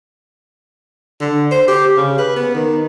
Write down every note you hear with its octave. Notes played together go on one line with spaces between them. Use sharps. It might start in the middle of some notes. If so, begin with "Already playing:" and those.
D3
C5
G4
C#3
B4
B3
D#3